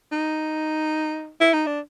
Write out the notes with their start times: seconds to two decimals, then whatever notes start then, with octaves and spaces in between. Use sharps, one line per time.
0.12 D#4
1.41 E4
1.54 D#4
1.67 D4